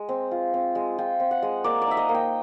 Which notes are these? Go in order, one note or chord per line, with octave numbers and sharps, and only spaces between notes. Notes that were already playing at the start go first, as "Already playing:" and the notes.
Already playing: G#3
C4
F4
C4
G#3
F4 G5
C4
F#5
G#3
A#3 D5
D5
D#4 E5
D#5
A#3
G5